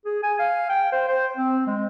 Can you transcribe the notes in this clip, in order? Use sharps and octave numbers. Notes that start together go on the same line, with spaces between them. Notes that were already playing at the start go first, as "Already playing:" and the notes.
G#4
G#5
F5
G5
C5
C5
C4
G#3